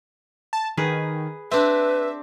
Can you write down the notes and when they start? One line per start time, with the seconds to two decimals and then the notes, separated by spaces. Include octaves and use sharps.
0.53 A5
0.77 D#3 G#4 B4
1.51 C4 D4 B4 E5